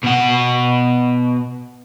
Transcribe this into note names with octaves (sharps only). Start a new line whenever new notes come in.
B2 F#5